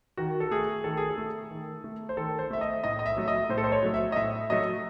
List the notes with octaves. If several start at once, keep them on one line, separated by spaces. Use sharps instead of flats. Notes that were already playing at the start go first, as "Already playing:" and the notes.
D#3 F#4
A4
A3 G#4
D#3 A4
G#4
A4
A3
D#3
A3
C5
D#3 A4
C5
A3 E5
D#5
A2 D#5
D#5
E5
F#3 A3
D#5
A2 C5
A4
C5
C#5
F#3 A3
E5
D#5
A2 E5
F#3 A3 D#5